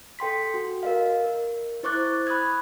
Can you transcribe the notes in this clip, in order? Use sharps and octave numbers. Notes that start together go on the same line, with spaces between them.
A4 G5 C6 B6
F#4
A#4 D#5 F5
A#4
E4 C5 C#6 D6 F#6 A6
B5 C#6 D#6 F#6 G#6